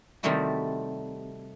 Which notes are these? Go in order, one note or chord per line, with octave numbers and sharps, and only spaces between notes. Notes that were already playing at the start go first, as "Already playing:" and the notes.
C3 D#3 G3 A3 E4 F#4